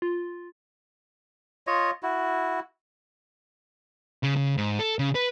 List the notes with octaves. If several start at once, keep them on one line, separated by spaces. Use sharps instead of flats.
F4
F4 C#5 D#5
E4 F#4
C#3
C#3
G#2
A4
C#3
B4